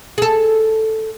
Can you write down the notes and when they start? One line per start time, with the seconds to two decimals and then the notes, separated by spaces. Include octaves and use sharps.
0.18 G#4 A4